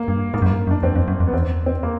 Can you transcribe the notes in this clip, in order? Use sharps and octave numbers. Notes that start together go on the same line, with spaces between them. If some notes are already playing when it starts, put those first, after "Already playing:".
Already playing: A#3
G2
G#2 A#3
F#2
A#3
G2
F#2
D4
F2 C4
F2
F#2
F2
B3
E2 C4
C4
A#3